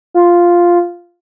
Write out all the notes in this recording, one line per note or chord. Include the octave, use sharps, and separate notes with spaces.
F4